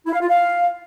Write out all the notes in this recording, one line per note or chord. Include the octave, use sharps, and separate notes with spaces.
E4
F5
F4
F5